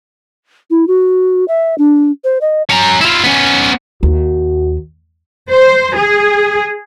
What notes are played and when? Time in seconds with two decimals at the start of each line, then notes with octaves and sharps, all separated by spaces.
0.70 E4
0.87 F#4
1.48 E5
1.78 D4
2.24 C5
2.41 D#5
2.70 C#4 A#5
3.01 E4 F4
3.23 B3 C#4
4.03 D#2 F#4
5.51 C5
5.97 G#4